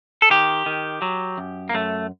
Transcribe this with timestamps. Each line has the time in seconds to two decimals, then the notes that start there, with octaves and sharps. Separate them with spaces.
0.22 A4
0.30 D#3 G4
0.66 D#3
1.02 F#3
1.38 F#2
1.69 A#3
1.74 F#2 A3